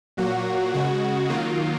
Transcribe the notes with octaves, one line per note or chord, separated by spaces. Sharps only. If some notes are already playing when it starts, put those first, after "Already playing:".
A#2 F#3 A#3 F#4
C#3 G#3 F#4
D#3 F#3 A#3 F4